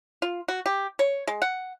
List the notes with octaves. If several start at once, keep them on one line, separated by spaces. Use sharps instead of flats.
F4
F#4
G4
C#5
G#3
F#5